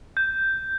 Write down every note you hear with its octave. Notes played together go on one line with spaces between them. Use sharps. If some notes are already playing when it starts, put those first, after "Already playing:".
G6